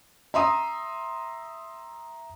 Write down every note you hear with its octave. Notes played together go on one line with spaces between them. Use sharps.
E5 A#5 C6 D#6